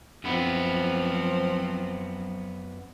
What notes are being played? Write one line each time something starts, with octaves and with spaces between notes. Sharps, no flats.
F#2 F3 B3 C4